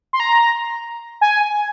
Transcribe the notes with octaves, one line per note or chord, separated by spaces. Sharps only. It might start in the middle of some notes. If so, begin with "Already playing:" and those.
C6
A#5
G#5